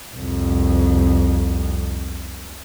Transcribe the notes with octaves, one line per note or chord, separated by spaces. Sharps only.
C2 F2